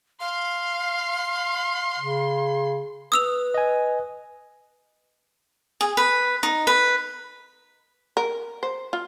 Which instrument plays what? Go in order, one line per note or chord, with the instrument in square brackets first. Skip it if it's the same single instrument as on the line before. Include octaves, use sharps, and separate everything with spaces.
[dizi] F5 [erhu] C6
[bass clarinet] C#3
[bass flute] B4 [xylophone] D#6 E6 F7
[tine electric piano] D#5 G#5
[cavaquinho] G#4
B4
D#4
B4
[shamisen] A#4
C5
F4